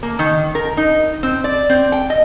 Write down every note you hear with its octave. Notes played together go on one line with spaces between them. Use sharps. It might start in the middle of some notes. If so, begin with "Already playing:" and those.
A#3
D#3
A#4
D#4
C4
D5
C4
G5
D#5